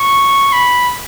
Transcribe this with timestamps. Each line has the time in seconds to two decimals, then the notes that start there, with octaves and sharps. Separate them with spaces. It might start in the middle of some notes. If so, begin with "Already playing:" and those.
Already playing: C#6
0.53 B5